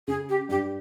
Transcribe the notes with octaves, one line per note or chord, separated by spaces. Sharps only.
C#3 G#4
G4
G2 G4